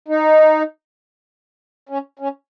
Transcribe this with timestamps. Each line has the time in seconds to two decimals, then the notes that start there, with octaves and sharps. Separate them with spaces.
0.08 D#4
1.89 C#4
2.19 C#4